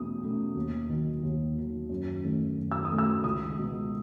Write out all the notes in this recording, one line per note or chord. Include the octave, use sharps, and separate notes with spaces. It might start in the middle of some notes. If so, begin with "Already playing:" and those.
Already playing: E2 B2 A3 C#4 D#6
B2 A3 C#4
D#2
D#3 F#3
D#2
D#3 F#3
F#2
D#3 A3 C#4
F#2
E6
D#6
D#3 A3 C#4
E6
C#2 D#6
B2 G#3 B3